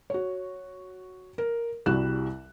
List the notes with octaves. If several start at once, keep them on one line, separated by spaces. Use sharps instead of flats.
F#4 C#5
A#4
C2 G3 E4 F#4 F#6 E7